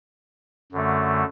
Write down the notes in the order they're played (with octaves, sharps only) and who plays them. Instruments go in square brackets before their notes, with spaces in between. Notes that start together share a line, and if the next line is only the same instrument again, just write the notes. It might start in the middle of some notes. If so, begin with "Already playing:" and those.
[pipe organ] F#2 D3 A3